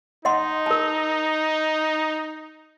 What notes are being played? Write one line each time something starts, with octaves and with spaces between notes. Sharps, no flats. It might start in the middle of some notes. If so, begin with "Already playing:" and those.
D#4 D#5 F#5 C6
A#4 A5